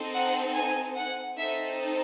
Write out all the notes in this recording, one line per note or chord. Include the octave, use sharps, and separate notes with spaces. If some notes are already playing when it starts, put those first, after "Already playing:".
Already playing: C4 D#4 A4
F#5
G#5
F#5
C4 D#4 A4 E5